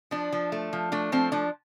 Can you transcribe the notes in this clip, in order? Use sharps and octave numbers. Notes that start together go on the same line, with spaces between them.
F3 D4
F3
A3
F3
A3 D4
F3 C4
F3 D4